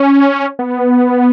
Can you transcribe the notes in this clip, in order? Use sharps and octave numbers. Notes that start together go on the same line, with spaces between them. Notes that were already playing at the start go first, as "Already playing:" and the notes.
Already playing: C#4
B3